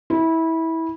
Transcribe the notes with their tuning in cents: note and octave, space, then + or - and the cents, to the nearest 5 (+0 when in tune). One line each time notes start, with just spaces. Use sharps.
E4 -20